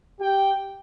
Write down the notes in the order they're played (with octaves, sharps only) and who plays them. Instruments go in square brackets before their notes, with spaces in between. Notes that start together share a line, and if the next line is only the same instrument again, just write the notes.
[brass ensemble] G4 G5